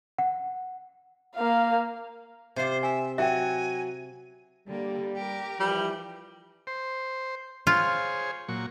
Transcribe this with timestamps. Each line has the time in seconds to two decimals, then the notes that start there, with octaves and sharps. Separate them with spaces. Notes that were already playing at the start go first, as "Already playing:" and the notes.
0.18 F#5
1.36 A#3 F5
2.56 C3 F4 C5
2.83 E5 G#5
3.18 F#3 F#4 E5 G5 G#5
4.68 D3 G3 A#3
5.16 G4 A#4
5.60 E3 F3 G3
6.67 C5
7.67 F4 G#4 C5 C#5
8.49 A#2 F#3 C#6